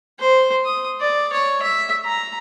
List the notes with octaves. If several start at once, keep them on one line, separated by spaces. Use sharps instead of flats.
C5
D#6
D5
C#5
E5
A#5